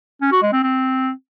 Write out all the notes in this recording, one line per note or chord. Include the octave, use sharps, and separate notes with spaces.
C#4
F#4
G#3
C4
C4